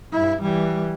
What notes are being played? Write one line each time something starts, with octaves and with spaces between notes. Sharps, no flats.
G2 E4
E3 G3